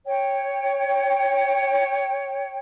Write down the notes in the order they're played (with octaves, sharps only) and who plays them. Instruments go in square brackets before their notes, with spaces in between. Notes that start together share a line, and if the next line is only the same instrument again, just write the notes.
[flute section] C#5 G5